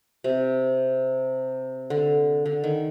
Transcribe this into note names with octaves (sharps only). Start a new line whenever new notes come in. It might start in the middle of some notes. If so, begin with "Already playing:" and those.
C3
D3
D3
D#3